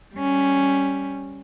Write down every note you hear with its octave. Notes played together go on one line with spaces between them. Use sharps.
G3 C#4